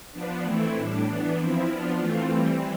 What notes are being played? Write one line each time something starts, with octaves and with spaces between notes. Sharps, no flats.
F3 B3 D4
E3 A3 C4 E4
A2 G3 D4
E3 B3 D4
F3 C4 E4
F3 B3 D4 F4
E3 A3 C4 F4
E3 G3 C4